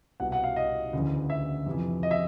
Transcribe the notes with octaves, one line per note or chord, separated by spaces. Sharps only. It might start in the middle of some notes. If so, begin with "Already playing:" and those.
C2 B2 F#5
F#5
F5
D#5
D2 C#3 E3
E5
F2 C3 E3
D#5
E5